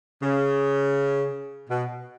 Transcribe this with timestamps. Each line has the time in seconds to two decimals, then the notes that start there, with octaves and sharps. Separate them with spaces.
0.22 C#3
1.70 B2